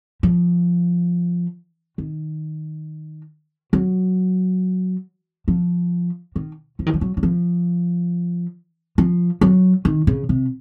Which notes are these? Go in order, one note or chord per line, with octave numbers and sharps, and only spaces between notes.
F3
D#3
F#3
F3
D#3
F3
D#3
F3
F#3
F#3
F3
F3
F#3
D#3
C#3
C3